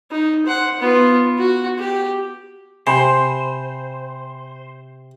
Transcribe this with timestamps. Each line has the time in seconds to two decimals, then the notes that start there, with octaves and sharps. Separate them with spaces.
0.11 D#4
0.46 C5 F#5
0.80 B3 F4
1.39 F#4
1.79 G4
2.87 C3 C5 G#5 B5